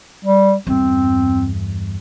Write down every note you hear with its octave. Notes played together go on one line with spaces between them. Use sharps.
G3
E2 G2 C4